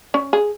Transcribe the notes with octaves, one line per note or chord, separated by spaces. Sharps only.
C#4
G#4